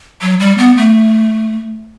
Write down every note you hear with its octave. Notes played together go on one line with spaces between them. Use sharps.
F#3
G3
B3
A3